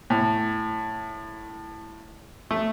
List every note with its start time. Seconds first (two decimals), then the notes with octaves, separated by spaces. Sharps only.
0.10 A2
2.51 A3